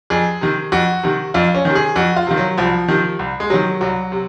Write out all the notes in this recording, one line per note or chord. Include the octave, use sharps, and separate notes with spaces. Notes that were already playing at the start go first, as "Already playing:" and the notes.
F2 G#4
C3 D#3
F2 F#4
C3 D#3
F2 F4
C#4
C3 D#3
G#4
F2 F#4
F4
C3 D#3
F#3
C2 F3
C3 D#3
C2
G#3
C3 D#3 F#3
C2 F#3
C3